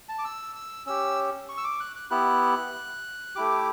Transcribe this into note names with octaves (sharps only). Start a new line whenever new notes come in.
A5
D6
E6
E6
C#4 G4 E6
C#6
E6
D6
F#6
F#6
B3 E4 G4 F#6
A3 E4 G4 D6